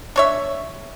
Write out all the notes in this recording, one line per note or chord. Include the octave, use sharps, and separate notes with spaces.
D4 C#5 E5